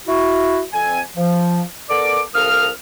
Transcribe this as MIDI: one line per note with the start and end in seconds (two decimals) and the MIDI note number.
0.08 0.62 64
0.08 0.62 66
0.73 1.00 41
0.73 1.00 60
0.73 1.00 80
1.16 1.62 53
1.90 2.21 59
1.90 2.21 69
1.90 2.21 70
1.90 2.21 74
1.90 2.21 86
2.34 2.69 36
2.34 2.69 69
2.34 2.69 70
2.34 2.69 77
2.34 2.69 87
2.34 2.69 89